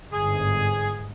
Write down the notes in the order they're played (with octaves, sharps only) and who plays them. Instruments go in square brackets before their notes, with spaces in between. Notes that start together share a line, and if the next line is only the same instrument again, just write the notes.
[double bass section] G1 G#2 [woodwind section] G#4